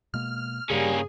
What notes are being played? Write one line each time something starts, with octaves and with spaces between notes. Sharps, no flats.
B2 G#3 A#3 F6
G2 C#3 G3 A#3 C#4 G#4